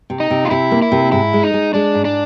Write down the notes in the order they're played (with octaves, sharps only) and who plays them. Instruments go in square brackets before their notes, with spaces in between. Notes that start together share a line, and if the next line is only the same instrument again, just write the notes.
[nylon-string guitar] C3
[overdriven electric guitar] D#4
[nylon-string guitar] C3
[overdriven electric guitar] F4
[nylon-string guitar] C3 [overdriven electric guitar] E4
[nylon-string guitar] A#3
[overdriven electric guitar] E4
[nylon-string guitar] C3
[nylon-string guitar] G#2 [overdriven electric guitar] E4
[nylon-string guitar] G#3
[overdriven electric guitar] D#4
[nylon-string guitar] G#3
[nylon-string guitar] G#3 [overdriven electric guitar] D4
[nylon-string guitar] G#2
[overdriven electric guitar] D4